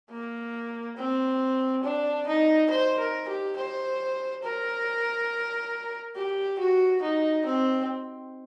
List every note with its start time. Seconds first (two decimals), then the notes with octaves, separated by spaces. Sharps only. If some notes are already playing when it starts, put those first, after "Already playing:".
0.11 A#3
0.97 C4
1.84 D4
2.27 D#4
2.70 C5
2.98 A#4
3.28 G4
3.57 C5
4.43 A#4
6.16 G4
6.59 F#4
7.02 D#4
7.45 C4